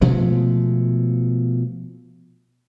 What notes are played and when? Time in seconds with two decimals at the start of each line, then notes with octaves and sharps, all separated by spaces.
0.01 B2 F3 G#3 A3